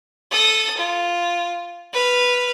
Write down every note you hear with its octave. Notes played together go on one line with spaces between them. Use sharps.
A4 D#6
F4
B4 F6